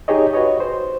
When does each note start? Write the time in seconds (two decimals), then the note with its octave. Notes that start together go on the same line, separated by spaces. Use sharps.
0.08 D#4 G4 G#4 C#5 D#5
0.34 F#4 B4 C#5 D#5
0.60 C5